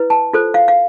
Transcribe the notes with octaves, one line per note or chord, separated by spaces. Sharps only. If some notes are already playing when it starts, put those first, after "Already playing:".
Already playing: E4 B4
A5
F4 A4 C5
F5
F5